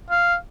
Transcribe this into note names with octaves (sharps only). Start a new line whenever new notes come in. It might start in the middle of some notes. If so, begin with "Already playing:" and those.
F5